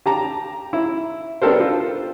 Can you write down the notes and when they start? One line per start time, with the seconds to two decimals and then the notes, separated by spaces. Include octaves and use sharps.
0.06 G4 A5 A#5
0.73 E4
1.42 B3 D4 G4 A4 A#4 C5
1.60 F4